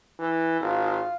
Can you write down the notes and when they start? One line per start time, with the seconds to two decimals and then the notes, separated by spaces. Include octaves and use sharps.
0.19 E3
0.61 G#1 F4